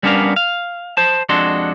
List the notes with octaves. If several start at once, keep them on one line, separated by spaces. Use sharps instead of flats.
G3 B3 C#4 D4 A#4 F5
F5
C5 A5
F2 G#3 D4 F#4 A4 C6